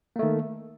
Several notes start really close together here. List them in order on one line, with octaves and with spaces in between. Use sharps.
A#3 A3 D#3